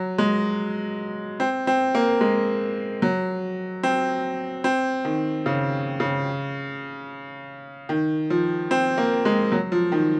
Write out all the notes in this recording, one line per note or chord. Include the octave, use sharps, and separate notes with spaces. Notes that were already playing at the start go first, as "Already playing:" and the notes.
Already playing: F#3
G#3
C4
C4
A#3
G#3
F#3
C4
C4
D#3
C#3
C#3
D#3
F3
C4
A#3
G#3
F#3
F3
D#3